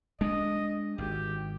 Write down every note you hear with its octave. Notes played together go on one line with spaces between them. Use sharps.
G#3 D4 D#5
G#1 G4